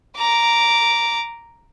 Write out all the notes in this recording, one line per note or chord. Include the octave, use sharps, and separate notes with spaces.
A#5 D6